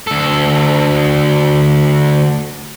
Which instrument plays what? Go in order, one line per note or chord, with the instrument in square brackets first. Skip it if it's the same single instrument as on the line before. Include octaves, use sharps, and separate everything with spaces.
[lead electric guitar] D2 A4